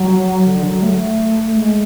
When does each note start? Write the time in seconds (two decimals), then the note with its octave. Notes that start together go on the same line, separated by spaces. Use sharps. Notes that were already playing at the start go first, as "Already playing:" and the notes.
Already playing: F#3
0.45 D3
0.63 F#3
0.82 A3
1.55 G#3